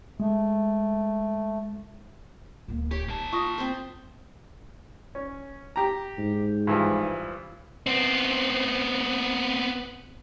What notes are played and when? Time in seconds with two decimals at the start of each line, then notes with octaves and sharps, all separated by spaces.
0.20 G#3 A3
2.68 D1 A#3
2.91 G4 C#5
3.08 A#3 D#4 A5
3.33 F4 C#6 D#6 A#6
3.58 C4 C5
5.15 C#4
5.76 G4 A#5
6.18 G#2
6.67 G2 E3 F3
7.87 B3 C4